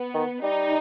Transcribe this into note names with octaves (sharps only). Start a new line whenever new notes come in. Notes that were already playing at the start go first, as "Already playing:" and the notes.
Already playing: B3
D#3
G3 D#4